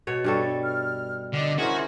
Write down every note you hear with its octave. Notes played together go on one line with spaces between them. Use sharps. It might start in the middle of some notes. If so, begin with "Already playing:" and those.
B2 C#5
G2 G3 A4 C#6
F6
D3 D#5 D6
C#4 E4 F#4 G#4 A#4 C5